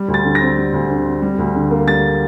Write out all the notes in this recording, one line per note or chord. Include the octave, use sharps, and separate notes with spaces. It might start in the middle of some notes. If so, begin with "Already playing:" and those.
Already playing: G3
D2
A6
D3
A#6
C4
G3
D2
D3
C4
G3
D2
D3
A#3
G3 A6